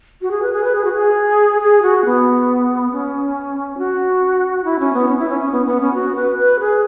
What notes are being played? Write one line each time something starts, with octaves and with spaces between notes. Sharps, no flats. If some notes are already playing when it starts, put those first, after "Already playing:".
F#4
G#4
B4
G#4
B4
G#4
F#4
G#4
G#4
F#4
B3
C#4
F#4
E4
C#4
B3
C#4
E4
C#4
C#4
B3
B3
C#4
F#4
B4
B4
G#4